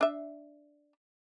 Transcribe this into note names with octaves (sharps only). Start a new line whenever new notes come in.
D4 E5